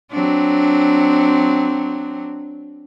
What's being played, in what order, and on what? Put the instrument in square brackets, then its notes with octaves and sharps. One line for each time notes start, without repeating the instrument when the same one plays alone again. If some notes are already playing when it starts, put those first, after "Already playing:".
[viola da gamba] F#3 C4 D4